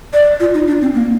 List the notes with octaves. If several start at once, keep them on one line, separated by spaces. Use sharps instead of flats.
D5
F4
D#4
D4
C4
A#3